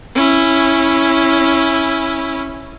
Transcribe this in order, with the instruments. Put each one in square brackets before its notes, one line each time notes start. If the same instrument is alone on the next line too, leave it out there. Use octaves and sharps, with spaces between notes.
[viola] C#4 E4